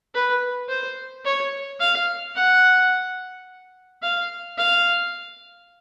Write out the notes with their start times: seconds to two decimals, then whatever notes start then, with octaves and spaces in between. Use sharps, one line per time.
0.14 B4
0.69 C5
1.25 C#5
1.80 F5
2.36 F#5
4.03 F5
4.58 F5